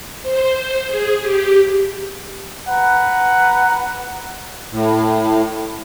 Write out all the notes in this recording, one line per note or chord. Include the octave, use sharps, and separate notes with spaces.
C5
G#4
G4
B4 F#5 A#5
A2